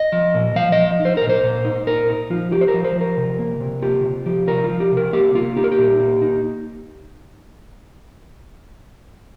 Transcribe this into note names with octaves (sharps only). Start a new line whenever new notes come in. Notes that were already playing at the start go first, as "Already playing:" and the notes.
Already playing: D#5
F3
A#2
F3 F5
D#5
F3
D#4
C5
A#2 A#4
C5
A#2
D#4
A#2 A#4
D#4
F3 F4
F4 G4
C5
A#4
F3
C5
F3
A#4
C3
A#3
C3
F4 G4
C3
F3 G4
F4 A#4
F4
F3
G4
C3
A#4
A#3 G4
A#3 F4
D#4 G4
A#4
G4
A#2
A#3
D#4